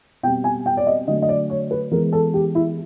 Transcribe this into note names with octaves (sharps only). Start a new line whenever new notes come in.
B2 G3 C4 G5
G#5
G5
D5
D#5
D3 F#3 A3 D#5
D#5
D5
C#5
B4
E3 G#3 B3 A#4
A4
G4
E4